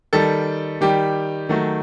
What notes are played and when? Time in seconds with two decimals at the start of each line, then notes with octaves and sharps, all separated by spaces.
0.13 D#3 G3 A4
0.81 D#3 G3 G4
1.49 D#3 F#3 A3